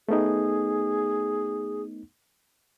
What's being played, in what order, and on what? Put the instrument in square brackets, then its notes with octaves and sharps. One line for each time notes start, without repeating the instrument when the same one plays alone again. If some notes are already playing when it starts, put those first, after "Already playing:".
[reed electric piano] A3 B3 D#4 [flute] G#4